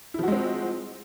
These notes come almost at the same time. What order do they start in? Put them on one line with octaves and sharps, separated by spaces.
E4 F3 F#4 G#3 C4